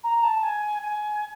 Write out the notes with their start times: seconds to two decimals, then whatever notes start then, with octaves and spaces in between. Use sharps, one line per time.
0.03 A#5
0.23 A5
0.43 G#5
0.82 G#5